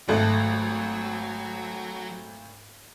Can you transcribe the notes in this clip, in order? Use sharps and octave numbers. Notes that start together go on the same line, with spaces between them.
G#1 F#3 A3 A4 F#6